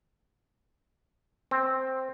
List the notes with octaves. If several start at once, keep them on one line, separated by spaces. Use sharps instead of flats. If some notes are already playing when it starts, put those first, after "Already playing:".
C4